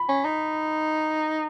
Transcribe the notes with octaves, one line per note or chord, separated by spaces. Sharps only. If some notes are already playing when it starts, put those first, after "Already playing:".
Already playing: B5
C#4
D#4